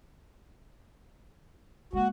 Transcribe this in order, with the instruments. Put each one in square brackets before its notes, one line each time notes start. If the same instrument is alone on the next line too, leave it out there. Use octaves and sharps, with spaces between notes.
[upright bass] G#3 A#3 [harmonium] F#4